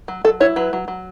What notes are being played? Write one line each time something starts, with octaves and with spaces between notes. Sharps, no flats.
F#3
F#3 A4
E4 C#5
F#3 B4
F#3
F#3